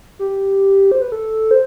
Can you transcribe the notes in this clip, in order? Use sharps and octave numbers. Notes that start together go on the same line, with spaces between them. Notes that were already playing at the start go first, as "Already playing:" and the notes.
G4
C5
B4
A4
C5